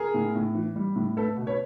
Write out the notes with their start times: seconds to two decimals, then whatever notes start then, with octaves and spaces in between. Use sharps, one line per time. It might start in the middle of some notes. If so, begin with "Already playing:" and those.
Already playing: G#4 A#4
0.14 A2
0.35 A2
0.55 E3
0.76 G3
0.96 A2
1.17 A3 A4 B4
1.37 B2
1.47 B4 C#5